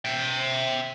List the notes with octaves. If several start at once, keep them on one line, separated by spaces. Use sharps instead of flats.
E5 G5